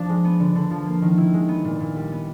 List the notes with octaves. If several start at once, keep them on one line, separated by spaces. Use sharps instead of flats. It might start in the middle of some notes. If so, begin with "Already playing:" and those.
Already playing: F3 D4
G#3
B3
D3
D3
F3
A#3
D#3
E4
G#3
B3
A#2
A#2
G3
B3